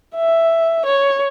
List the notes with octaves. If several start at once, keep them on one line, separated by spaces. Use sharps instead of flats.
E5
C#5